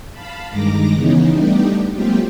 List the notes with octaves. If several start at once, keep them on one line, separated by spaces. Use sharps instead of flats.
F5 A5 B5
G2 D#3 G#3 A#5 D6 A#6
C#3 E3 B3 C#4 D#4
G3 A3 B3 D4 D#4 G4
F#3 G#3 A#3 C4 F4 G4